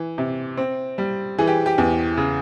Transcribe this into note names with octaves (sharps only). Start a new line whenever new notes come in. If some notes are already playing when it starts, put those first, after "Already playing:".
Already playing: E3
C3
C4
G3
E3 G#4
G4
G4
E2
C#3